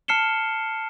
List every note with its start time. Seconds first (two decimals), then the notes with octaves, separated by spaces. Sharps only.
0.08 A5 F6 C7 C#7 E7 G7